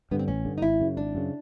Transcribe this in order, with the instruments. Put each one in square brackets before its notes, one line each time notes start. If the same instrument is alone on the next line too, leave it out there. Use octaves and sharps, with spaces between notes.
[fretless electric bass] G2 D3 [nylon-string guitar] B3
[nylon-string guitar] C4
[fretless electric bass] A1 [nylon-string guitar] C#4
[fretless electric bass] G2 D3
[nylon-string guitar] D#4
[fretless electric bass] G#1 [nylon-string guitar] E4
[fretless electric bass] F#2 C#3
[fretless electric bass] G#1 [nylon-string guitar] D4
[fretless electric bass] F#2 C#3